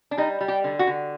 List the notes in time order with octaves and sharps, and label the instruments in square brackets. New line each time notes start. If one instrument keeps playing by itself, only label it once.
[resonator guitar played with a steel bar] D4
G3 D#4
G3
G4
D3
F#4
D3